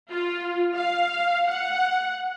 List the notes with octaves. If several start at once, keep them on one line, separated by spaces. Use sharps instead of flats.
F4
F5
F#5